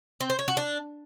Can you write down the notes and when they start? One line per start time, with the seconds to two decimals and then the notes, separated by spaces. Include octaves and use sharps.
0.20 C4
0.30 C5
0.39 C#5
0.48 F#4
0.57 D4